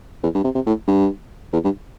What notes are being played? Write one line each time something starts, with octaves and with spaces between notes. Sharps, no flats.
E2
G2
C3
C3
A2
G2
E2
G2